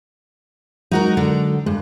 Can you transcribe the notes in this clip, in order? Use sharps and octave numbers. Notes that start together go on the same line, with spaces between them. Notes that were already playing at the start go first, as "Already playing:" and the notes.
F#3 G#3 D#4 F#4 A#4
D3
G2 G#3